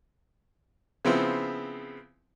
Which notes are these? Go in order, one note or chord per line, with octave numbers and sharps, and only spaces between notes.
C#3 F3 B3 C4 E4